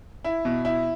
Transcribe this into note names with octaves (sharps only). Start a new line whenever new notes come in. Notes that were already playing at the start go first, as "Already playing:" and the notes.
E4
B2
E4